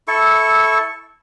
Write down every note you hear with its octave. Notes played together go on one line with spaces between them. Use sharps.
E4 A4 C#6